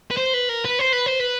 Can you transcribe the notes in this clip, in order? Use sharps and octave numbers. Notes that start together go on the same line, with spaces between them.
B4
C5
B4
A#4
B4
C5
B4
C5
B4